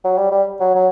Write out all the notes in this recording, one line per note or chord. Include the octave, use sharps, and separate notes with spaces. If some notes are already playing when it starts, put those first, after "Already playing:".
F#3
G3
G3
F#3
F#3